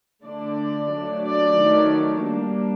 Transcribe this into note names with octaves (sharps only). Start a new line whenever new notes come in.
D3 A3 D4 D5
F#3 A3 D4
D5
D#3 F#3 A3
G3 A#3 D4